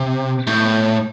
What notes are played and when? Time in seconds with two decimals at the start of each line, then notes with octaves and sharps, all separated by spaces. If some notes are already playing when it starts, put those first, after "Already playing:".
Already playing: C3
0.47 A2